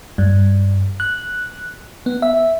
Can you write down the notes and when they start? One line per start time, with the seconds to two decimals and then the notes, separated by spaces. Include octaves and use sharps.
0.18 G2
1.00 F#6
2.06 B3
2.22 E5